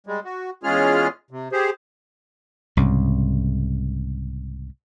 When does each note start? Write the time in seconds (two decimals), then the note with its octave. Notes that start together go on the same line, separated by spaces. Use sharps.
0.07 G3 G#3
0.25 F#4
0.63 E2 G#3 C#4 F4 G#4 F6
1.31 C3
1.52 G4 G#4 C5
2.77 C2 G#2 C#3